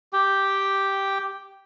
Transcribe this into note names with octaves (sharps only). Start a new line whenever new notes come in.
G4 G5